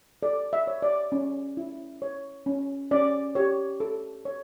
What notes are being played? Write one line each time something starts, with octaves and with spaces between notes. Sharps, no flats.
A4 D5
E5
C#5
D5
C#4
E4
C#5
C#4
C#4 D5
G4 C#5
A4
C#5